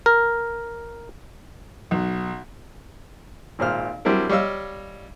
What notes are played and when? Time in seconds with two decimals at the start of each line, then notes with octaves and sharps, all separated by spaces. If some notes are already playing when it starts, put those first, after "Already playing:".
0.06 A#4
1.91 B1
3.59 G#1 A#2 C5 F6
4.05 F#3 G3 C4 D4 E4 A#4
4.29 G3 C#5 D#5 F5 E6